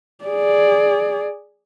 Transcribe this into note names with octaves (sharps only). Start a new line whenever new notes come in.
G#4 D5